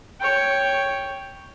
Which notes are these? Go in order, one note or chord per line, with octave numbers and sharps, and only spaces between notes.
C#5 G5